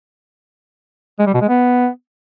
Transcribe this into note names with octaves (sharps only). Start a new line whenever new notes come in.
G#3
G3
B2
G#3
B3